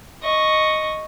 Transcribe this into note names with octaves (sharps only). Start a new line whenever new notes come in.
D#5 C#6